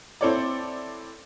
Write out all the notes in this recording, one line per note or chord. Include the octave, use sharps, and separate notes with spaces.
C4 E4 A4 C#5 D5